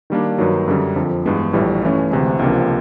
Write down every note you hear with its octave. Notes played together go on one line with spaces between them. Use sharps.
D#3 G3 A#3 D4
G2 D#3 F#3
F#2 D3 G3
F2 D3 F3
G2 E3 G#3 B3
A#1 A2 E3 G3
G2 E3 A3 C#4
D2 C3 E3 G#3
C#2 C3 F3 A#3 D4